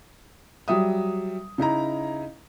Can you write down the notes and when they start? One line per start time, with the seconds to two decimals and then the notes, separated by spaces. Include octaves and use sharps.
0.68 F#3 G3 E5 D#6
1.58 C#3 D#4 E4 A#5